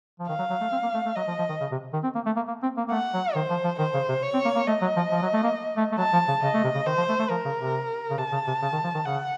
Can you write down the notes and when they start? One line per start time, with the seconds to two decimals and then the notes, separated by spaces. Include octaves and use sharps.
0.19 F3
0.28 D#3 F5
0.39 F#3
0.50 F#3
0.61 A3
0.72 C4
0.83 A#3
0.94 A3
1.06 A3
1.16 F#3 D#5
1.28 F3
1.39 F3
1.49 D#3
1.61 C#3
1.72 C3
1.93 D#3
2.03 C4
2.15 A#3
2.26 A3
2.36 A#3
2.48 A#3
2.63 C4
2.77 A#3
2.88 A#3
2.91 A3 F#5
3.14 F#3
3.35 D#3 C5
3.50 F3
3.64 F3
3.79 D#3 C5
3.94 C#3
4.09 C3
4.23 C#5
4.34 C4
4.45 A#3
4.56 A#3
4.67 A3 D#5
4.82 F#3
4.96 F3
5.11 F3
5.22 F#3
5.33 A3
5.43 A#3
5.77 A3
5.92 A3
5.98 F#3 A5
6.13 F3
6.28 C#3
6.42 C#3 D#5
6.54 A3
6.64 C3
6.75 C#3
6.86 D#3 C5
6.97 F3
7.09 A3
7.19 A3
7.30 F3 A#4
7.45 C#3
7.59 C3
8.10 C#3
8.18 C3 A5
8.32 C#3
8.47 C3
8.62 C#3
8.73 D#3
8.84 F3
8.94 D#3
9.05 C#3 F#5